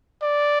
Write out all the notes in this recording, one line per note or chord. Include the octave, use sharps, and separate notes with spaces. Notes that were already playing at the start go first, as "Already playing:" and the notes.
D5